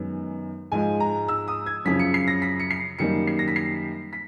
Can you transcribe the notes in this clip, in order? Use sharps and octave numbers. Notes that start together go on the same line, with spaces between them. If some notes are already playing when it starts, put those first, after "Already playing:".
Already playing: F#2 D#3 G#3 B3
G#2 F3 G#3 G#5
A#5
E6
D#6
G#6
F#2 C#3 F3 B6
C#7
C7
A#6
B6
C#7
C7
F#2 D#3 G3 A#3 C#7
C7
A#6
B6
C7
B6